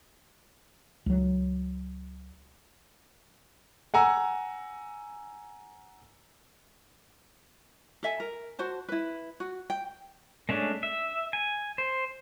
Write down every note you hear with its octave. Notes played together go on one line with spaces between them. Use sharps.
C#2 F#3
F#5 G#5 A#5 E6
A4 E5 G#5
A#4
F#4 C5 A5
E4 B4
F#4
G5
G#3 A3 C#4 D4
E5
G#5
C5